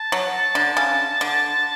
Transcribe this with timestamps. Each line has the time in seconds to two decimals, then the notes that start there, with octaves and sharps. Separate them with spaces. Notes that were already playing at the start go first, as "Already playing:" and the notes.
Already playing: A5
0.12 F#3
0.55 D3
0.77 C#3
1.21 D3